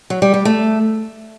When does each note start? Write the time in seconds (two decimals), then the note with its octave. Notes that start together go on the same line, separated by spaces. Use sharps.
0.10 F#3
0.22 G3
0.34 G3
0.45 A3